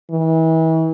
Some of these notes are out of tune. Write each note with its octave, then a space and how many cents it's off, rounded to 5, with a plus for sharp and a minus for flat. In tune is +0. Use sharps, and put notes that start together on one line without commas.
E3 -35